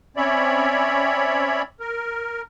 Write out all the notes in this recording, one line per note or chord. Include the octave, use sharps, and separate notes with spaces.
C4 C#4 C#5 D5 E5 B5
A#4